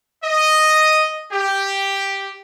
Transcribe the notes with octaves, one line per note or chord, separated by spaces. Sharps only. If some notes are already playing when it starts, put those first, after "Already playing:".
D#5
G4